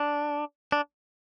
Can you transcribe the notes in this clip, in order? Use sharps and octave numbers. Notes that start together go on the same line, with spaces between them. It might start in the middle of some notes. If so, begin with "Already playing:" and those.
Already playing: D4
D4